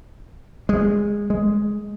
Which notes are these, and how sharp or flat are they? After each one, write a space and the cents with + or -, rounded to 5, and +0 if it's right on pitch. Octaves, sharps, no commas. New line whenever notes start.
G#3 -15
G#3 +5